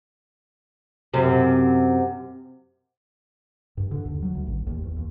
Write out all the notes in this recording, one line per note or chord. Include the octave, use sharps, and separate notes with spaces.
F#2 C3
G2
D3
D#2
F#3
D2
A1
D#2
E2
D#2